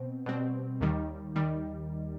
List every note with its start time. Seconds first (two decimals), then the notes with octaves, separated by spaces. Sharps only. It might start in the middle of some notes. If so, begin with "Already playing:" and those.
Already playing: B2 C4
0.26 B2 G3 C4
0.81 D#2 D#3 G3
1.36 D#3 G3